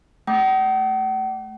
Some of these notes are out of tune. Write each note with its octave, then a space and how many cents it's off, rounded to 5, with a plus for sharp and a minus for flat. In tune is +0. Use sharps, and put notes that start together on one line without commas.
A3 -5 F#5 +45 D6 +0